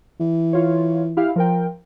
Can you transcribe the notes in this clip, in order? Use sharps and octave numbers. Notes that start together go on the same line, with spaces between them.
E3
F4 C#5
E4 G4 F5
F3 A#4 G5